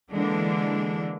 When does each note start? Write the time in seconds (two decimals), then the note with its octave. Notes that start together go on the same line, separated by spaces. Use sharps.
0.12 D3 E3 G#3 A#3 D4